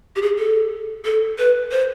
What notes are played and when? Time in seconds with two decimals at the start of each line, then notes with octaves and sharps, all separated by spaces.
0.16 G4
0.22 G#4
0.38 A4
1.05 A4
1.38 B4
1.72 C5